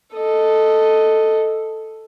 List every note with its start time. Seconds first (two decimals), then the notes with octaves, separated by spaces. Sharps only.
0.14 A4 D#5